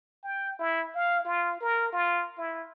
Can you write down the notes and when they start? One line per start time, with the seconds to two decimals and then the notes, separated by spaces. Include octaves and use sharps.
0.24 G5
0.59 E4
0.94 F5
1.25 F4
1.61 A#4
1.93 F4
2.38 E4